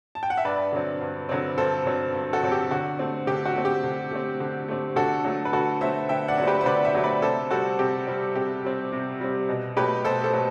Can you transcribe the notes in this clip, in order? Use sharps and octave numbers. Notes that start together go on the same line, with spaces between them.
A5
G5
F#5
E5
G2 B4 D5
D3 F#3 C4
G2
D3 F#3 C4
G2 A4 C5
D3 F#3 C4
G2
F#4 A4
D3 F#3 C4
G4
D3 F#4
A3 C4
D3 G4
F#4
A3 C4
G4
D3
A3 C4
D3
A3 C4
D3 F#4 A4
F#3 A3
B4
D3 F#4 A4
F#3 A3 C5 E5
D3 E5 G5
D5 F#5
F#3 A3 C5
G4 B4
C5
D3 B4 D5
C5 E5
F#3 A3
B4 D5
C3 A4 C5
G3 C4 F#4 A4
C3 G4
G3 C4
C3 G4
G3 C4
C3
G3 C4
B2
F#3 A3 G4 B4
B2 A4 C5
A4 C5
F#3 A3